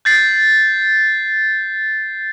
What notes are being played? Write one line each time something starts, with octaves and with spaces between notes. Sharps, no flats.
G6 A6 C7